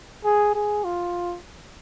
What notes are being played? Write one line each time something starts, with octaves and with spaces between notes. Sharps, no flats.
G#4
G#4
F4